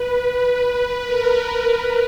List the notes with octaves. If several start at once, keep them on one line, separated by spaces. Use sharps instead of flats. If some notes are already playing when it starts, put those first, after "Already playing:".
Already playing: B4
B4
A#4